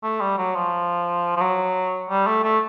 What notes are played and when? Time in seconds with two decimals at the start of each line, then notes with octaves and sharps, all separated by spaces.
0.03 A3
0.21 G3
0.38 F#3
0.55 F3
1.37 F3
1.41 F#3
2.10 G3
2.27 A3
2.43 A3